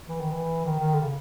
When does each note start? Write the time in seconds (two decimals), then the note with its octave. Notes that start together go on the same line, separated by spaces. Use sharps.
0.08 E3
0.20 D#3
0.32 E3
0.66 D#3
0.79 D#3
0.94 D3
1.01 C#3